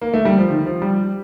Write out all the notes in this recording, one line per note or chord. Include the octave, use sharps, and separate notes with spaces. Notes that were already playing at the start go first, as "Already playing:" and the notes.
A#3
A3
G3
F3
D#3
F3
G3